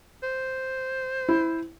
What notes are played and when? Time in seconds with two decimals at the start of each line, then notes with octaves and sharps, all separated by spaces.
0.23 C5
1.29 E4